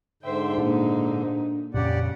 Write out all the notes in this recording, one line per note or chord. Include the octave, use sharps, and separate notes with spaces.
G#2 D3 C5 E5 G5
A#2 D4 D#4
F2 A#2 C#3 G4 D5 F#5